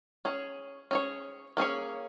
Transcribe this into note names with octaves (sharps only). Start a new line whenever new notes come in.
C#4 G#4 C#5
C#4 G#4 C#5
A#3 C#4 G#4 C#5